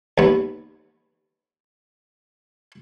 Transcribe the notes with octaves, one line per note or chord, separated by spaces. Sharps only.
D#2 B3